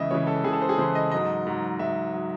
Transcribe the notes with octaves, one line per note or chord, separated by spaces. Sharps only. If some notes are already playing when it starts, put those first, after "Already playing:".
Already playing: C#2 C#3 E3 D#5 E5
C#2 C#3 E3 C#5
A4
C#2 C#3 E3 G#4
A4
C5
G#4
C#2 C#3 E3 C5
D#5
G#2 F#3 D#5
G#2 F#3
G#2 F#3 E5
F#3